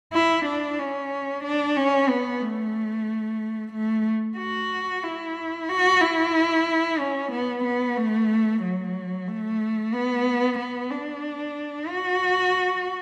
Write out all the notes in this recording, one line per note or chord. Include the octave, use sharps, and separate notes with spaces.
E4
D4
C#4
D4
C#4
B3
A3
A3
F#4
E4
F#4
E4
C#4
B3
B3
A3
F#3
A3
B3
B3
D4
F#4